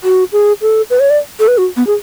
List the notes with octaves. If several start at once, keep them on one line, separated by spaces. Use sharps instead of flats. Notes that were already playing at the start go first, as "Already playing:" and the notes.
F#4
G#4
A4
B4
C#5
D5
A4
B4
F#4
B3
G#4